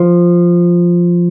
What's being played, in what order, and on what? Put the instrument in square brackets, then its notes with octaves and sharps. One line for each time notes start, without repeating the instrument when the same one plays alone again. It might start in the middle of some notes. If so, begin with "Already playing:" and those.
Already playing: [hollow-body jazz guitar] F3